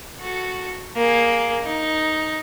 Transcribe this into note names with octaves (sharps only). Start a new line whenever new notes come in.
F#4 A4
A#3 G#4
D#4